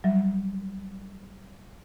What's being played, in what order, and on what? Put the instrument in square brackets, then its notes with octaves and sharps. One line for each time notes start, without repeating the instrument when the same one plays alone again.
[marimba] F#3 G3 E5